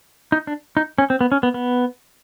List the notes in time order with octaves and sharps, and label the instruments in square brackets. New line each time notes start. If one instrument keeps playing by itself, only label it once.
[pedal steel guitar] D#4
D4
D#4
C#4
C4
B3
C#4
B3
B3